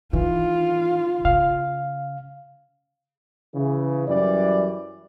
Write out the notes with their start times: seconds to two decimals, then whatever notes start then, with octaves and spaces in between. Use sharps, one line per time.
0.13 D#3 E3 F4
1.25 C#3 F5
3.55 C#3 E3
4.08 F#2 E3 G3 D5